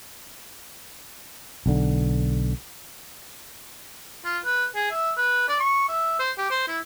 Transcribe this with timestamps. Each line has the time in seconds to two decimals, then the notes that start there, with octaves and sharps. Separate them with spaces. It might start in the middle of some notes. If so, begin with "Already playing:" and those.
1.66 B1 D3
4.25 F4
4.45 B4
4.75 G#4
4.91 E5
5.17 B4
5.49 D5
5.60 C#6
5.89 E5
6.19 C5
6.38 G4
6.50 C5
6.68 E4